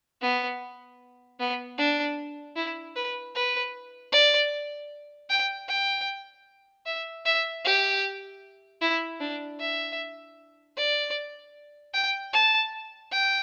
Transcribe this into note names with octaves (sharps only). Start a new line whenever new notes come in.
B3
B3
D4
E4
B4
B4
D5
G5
G5
E5
E5
G4
E4
D4
E5
D5
G5
A5
G5